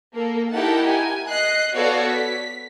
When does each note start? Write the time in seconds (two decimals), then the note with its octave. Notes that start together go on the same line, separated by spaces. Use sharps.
0.13 A#3 A4
0.52 D#4 E4 G4 A#4 F#5 A5
0.90 G#5
1.28 D#5 F#6 C7
1.73 B3 F#4 A4 C#5 D5 F5
2.06 B6